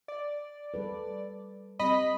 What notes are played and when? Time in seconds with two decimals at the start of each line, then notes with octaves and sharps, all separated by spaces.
0.08 D5
0.74 G3 A4 B4
1.79 G3 C4 G4 D#5 B5